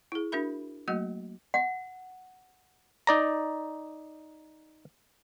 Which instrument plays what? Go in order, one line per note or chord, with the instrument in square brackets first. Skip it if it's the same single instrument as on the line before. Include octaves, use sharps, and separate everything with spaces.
[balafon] E4 G#4
D4 F#4 A#4 E5 B5
F#3 A3 A#3 F#4 D#5 F#5
[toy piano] F#5
[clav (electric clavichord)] D#4 D5 A#5